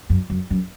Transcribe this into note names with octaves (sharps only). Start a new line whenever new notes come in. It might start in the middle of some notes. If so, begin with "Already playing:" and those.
F#2
F#2
F#2